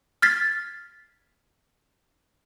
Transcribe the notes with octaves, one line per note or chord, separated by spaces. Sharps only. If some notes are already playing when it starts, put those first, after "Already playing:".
F6 G#6 A6 B6 C7